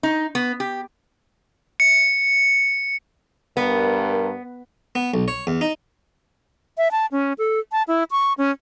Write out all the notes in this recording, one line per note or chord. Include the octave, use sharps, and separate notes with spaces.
D#4
B3
G4
C#7
G2 B3 A#4
B3
B1
C#5
E2
D#4
E5
A5
C#4
A4
A5
E4
C#6
C#4